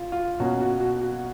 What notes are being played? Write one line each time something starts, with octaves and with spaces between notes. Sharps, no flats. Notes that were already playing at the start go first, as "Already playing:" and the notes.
Already playing: F4
F4
B2 A#3 C#4 F#4
F#4
F#4
F#4